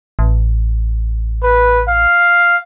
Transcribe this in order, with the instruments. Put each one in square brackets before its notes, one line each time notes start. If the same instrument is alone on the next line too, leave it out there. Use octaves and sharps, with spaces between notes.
[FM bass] A1
[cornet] B4
F5